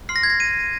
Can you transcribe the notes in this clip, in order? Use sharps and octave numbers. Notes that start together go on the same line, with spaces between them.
C6 F6 C7
A#6
G#6
A#6
D#7